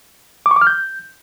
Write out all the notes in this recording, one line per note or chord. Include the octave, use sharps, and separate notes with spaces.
D6
C#6
D6
F6
G6